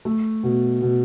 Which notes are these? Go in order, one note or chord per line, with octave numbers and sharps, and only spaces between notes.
A3
B2
B2